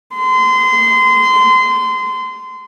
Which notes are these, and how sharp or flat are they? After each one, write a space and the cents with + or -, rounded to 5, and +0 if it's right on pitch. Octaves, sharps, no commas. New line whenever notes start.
C6 -25